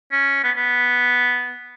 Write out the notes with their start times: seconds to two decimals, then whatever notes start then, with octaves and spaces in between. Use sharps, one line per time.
0.12 C#4
0.44 B3
0.57 B3